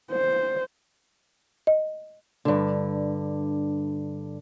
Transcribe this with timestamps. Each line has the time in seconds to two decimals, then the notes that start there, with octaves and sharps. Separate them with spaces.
0.12 C5
1.67 D#5
2.45 G2 D3